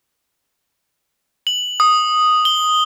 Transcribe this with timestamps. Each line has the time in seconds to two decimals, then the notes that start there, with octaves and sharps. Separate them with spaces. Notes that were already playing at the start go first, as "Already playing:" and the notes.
1.47 F#7
1.80 D#6
2.45 G7